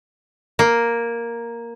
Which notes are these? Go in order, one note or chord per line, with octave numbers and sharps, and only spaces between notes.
A#3